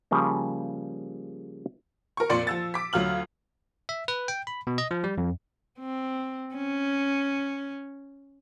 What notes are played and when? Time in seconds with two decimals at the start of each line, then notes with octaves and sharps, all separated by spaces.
0.11 C#3 F3 G3 A#3
2.17 A#4 C#6
2.30 F2 A#2 D5 C6 C#7
2.47 F3 E6 A6
2.74 D6 B6
2.93 D2 F#3 F4 F6 F#7
3.89 E5
4.08 B4
4.28 G5
4.47 B5
4.67 B2
4.78 D#5
4.91 F3
5.04 G3
5.18 F2
5.80 C4
6.55 C#4